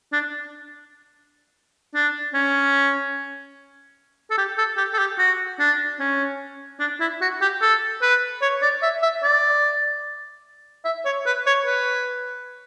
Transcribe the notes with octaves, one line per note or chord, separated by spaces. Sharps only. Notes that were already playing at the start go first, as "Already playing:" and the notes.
D4
D4
C#4
A4
G4
A4
G4
A4
G4
F#4
D4
C#4
D4
E4
F#4
G4
A4
B4
C#5
D5
E5
E5
D5
E5
C#5
B4
C#5
B4